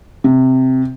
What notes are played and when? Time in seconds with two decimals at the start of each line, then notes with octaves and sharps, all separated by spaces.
0.24 C3